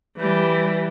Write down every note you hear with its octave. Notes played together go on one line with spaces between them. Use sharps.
E3 G3